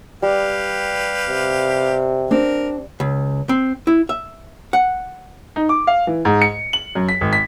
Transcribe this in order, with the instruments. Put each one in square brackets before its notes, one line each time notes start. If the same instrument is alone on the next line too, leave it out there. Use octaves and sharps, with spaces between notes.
[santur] G3 [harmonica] G4 B4 F5
[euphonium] C3
[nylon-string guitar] C4 D4 [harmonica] A#4
[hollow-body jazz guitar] C#2
C4
E4
E5
F#5
[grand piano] D#4
D6
F5
E3
G#2
C#7
F#7
F#2
B6
G#1
B6